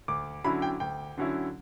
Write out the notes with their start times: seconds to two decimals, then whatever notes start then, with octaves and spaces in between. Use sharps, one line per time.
0.08 D2 D6
0.44 D3 F#3 C#4 E4 B5
0.62 G5
0.80 D2 G5
1.18 D3 F#3 C#4 E4